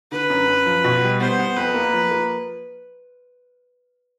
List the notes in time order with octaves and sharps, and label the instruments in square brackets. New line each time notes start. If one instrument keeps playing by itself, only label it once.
[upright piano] D3 [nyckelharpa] B4
[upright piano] F#2
F#2
F3
B2
G3
[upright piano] B3 [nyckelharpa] C5
[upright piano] B3
[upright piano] F2 [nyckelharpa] B4
[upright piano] A#3
F3
A#3